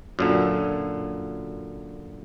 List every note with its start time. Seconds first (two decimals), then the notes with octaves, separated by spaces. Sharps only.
0.19 F#2 A#2 D3